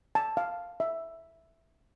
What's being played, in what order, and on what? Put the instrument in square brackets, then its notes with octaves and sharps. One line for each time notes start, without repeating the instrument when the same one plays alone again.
[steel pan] A5
F5
E5